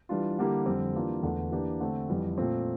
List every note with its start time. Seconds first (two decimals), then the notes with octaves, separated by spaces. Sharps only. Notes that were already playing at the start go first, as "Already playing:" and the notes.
0.09 E3 G3 D4 F4
0.39 D3 G3 A#3 E4 G4
0.66 F2 D3 G3 C4
0.95 E3 G3 A#3 D4 F4
1.23 E2 D3 A3
1.52 E3 A#3 D4 G4
1.80 D3 A3 C4
2.09 F2 E3 G3
2.37 A#2 A3 C4 F4